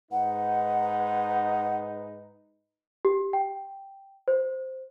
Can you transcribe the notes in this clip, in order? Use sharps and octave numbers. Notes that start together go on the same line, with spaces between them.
G#2 D#4 B4 F#5
G4
G5
C5